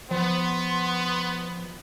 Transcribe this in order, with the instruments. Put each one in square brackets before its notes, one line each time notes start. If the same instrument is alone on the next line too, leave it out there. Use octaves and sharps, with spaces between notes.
[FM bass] F3 [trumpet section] B3 [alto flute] C6